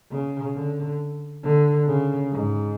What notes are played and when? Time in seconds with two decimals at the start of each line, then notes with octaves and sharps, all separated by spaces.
0.11 C#3
0.55 D3
1.43 D3
1.87 C#3
2.31 G#2